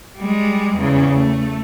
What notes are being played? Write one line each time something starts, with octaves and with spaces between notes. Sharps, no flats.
G3 G#3
E2 C#3
A3